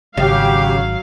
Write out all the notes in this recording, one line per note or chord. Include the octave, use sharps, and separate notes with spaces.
G#1 C#3 F#3 G4 F5